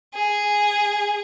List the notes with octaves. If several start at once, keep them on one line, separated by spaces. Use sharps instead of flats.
G#4